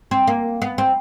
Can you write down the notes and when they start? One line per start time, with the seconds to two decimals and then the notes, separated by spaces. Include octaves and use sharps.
0.11 C4
0.27 A#3
0.62 B3
0.78 C4